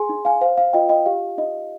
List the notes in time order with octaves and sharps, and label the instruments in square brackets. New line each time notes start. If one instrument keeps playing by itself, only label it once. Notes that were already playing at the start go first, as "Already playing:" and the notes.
Already playing: [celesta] G#4 G#5 C6
D#4
F5 G#5
C5 F5
F5
F4 D#5 G5
D#5 G5
G4 F5
D#4 D#5